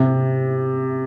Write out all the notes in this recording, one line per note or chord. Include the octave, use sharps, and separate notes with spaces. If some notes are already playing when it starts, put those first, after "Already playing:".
Already playing: C3